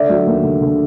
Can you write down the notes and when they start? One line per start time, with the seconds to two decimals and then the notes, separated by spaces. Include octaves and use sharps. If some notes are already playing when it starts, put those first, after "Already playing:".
Already playing: D3 D5 E5
0.09 F#3
0.27 D#2
0.43 D3
0.61 D3